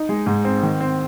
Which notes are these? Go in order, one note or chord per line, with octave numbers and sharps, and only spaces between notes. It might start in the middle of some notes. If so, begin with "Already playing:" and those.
Already playing: D#4
G#3
G#2
C4
D#3
C4